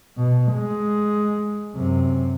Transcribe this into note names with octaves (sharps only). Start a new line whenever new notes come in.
B2
G#3
F#2 C3